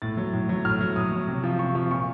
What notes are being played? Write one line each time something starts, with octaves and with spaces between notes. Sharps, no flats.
A2 A6
F#3
A2
F#3
A2 F6
F#3
A2 D#6
F#3
C3
F3
C3 C#6
F3
A#2 C#6